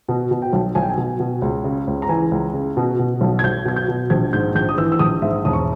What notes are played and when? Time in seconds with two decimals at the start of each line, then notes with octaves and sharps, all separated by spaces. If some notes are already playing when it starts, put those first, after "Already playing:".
0.08 B2
0.31 B2
0.42 G5
0.53 B1
0.75 B1 G#5
0.82 G5
0.89 G#5
0.98 B2
1.20 B2
1.42 C#2
1.64 C#3
1.87 C#2
2.02 A#5
2.09 E3 G#5
2.31 C#2
2.53 C#3
2.77 B2
2.99 B2
3.21 B1
3.39 G#6
3.43 B1 G6
3.65 B2 G#6
3.76 G6
3.88 B2
4.10 A#1 G#6
4.33 G#2 G6
4.55 A#1 G6
4.69 D#6
4.78 E3 E6
4.92 E6
4.99 A#1 D#6
5.22 G#2 E5
5.45 E1 D#6
5.53 C#6